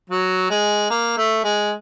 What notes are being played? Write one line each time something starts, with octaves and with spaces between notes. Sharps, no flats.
F#3
G#3
A#3
A3
G#3